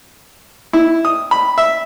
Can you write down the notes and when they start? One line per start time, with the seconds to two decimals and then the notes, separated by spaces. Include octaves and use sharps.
0.73 E4
1.05 D#6
1.31 B5
1.58 E5